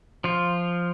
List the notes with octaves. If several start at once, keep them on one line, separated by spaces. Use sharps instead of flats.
F3 F4